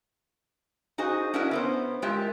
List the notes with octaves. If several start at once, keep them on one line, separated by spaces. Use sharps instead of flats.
D#4 F#4 G#4 C5 D#5
C#4 D4 E4 F#4 A#4 E5
B3 C#4 C5
G#3 F4 G4 A#4 E5